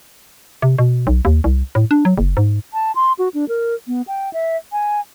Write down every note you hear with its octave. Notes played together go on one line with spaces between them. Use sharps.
C3
B2
B1
D#2
C2
A2
D4
F#3
F#1
G#2
A5
C6
F#4
D4
A#4
B3
G5
E5
G#5